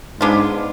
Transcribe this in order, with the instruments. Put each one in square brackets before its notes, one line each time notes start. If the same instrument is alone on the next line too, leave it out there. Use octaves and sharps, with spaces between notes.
[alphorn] G#2 [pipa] G#3 B3 D4 F4